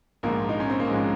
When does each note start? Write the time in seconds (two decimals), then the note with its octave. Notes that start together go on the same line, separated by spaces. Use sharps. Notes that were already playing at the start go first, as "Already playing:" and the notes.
0.23 A#1 G#2 F3 A#3
0.49 D#4
0.60 C#4
0.70 C4
0.80 A#3
0.90 A#1 G#2 F3 G#3